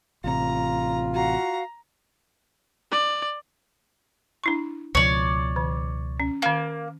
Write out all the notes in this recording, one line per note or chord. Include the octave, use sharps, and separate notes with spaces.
A1 C3 F4 A#5
F#4 F5 A#5
D5
D4 E4 C#6
C#2 B2 F3 C#5 D5
D#3
C#4
D#3 A#3 F5